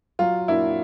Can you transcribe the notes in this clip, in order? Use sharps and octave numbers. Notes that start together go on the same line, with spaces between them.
F#3 F4
A#3 D4 E4 F#4